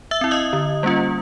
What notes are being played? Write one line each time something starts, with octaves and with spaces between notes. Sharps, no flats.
E5 E6
C4 E4
D#5 D#6
D3
G3 A#3 C#4 F4